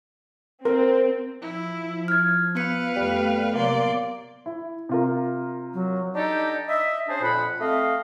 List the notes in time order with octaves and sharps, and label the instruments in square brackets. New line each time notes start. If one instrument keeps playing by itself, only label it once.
[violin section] C4 [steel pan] A#4
[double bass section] F3 [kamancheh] E4
[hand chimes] F6 G#6
[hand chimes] B3 C#7 [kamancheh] B4 F5
[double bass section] F2 A3 [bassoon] G3
[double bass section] C3 F#3 [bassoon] A#3 [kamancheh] D5 C6
[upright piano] E4
C3 F4 A#4
[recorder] F#3
[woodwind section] D4 D#4 G4 A4 D#5
D#5 E5
C#4 D4 G#4 C5
F2 A#2 F#5 B5
A3 C4 D#5 F5